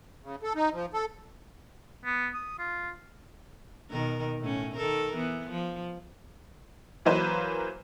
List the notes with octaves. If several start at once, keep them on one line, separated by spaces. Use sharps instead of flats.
C#3
A4
D#4
F3
A4
B3
D#6
F4
B2 D#3 A#4
A2 C#4
D#3 A4 A#4
E3 B3
F3
E3 F#3 A#3 B4 C5